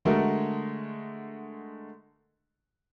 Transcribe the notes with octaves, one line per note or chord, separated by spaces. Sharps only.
D3 G#3 A3 F#4 A#4